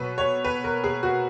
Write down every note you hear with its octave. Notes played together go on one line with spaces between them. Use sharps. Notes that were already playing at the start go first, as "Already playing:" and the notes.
Already playing: B2 F#3 B4
C#5
B4
A#4
G#4
F#4